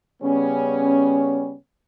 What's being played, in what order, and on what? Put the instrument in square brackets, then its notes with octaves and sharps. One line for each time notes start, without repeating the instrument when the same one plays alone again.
[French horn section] C#3 G3 B3 C#4